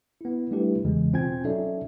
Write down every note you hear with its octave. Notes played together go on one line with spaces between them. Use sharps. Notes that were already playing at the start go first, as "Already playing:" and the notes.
B3 E4
G3 A3 D4 E4 G4 B4
E2 C#3 E3 G#3
B2 C4 F4 G5 G#5 G#6
F#3 C#4 D#4 A4 D5 E5